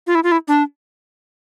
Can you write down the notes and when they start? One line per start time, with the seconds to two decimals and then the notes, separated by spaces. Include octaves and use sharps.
0.07 F4
0.15 E4
0.24 F4
0.32 E4
0.48 D4